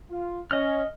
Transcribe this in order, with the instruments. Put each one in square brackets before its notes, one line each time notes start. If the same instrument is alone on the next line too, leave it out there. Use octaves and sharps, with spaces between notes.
[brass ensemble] F4
[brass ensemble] C#4 [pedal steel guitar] D#5 F6